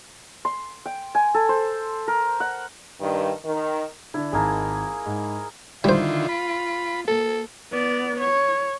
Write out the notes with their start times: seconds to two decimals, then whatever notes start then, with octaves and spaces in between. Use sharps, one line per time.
0.45 C6
0.86 G5
1.15 G#5
1.34 A4
1.49 C5
2.08 A#4
2.40 F#5
3.00 G2 D#3
3.45 D#3
4.14 D3 D4 E4
4.32 G#1 G#3 A#3 D#4 A5
5.06 G#2
5.84 D3 D#3 G3 E4 F4 C5
6.29 B5
7.08 A#3 A4
7.72 B3 D5
8.20 C#5